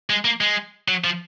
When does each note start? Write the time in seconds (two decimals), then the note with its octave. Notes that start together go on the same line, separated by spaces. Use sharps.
0.10 G#3
0.25 A#3
0.41 G#3
0.88 F#3
1.04 F3